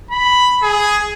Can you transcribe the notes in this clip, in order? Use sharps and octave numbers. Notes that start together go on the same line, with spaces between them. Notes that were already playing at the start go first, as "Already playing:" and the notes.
B5
G#4